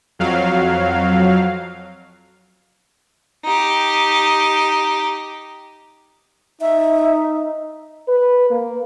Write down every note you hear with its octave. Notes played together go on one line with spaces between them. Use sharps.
F2 F#3 F5
D#4 G4
D#4 E5
B4
A#3